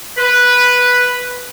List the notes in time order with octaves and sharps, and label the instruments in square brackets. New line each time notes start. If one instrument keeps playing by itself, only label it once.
[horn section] B4